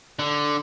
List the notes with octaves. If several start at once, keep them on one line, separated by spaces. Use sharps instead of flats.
D3